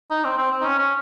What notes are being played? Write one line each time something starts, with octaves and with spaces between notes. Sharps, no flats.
D#4
C4
C4
C4
D#4
C#4
C#4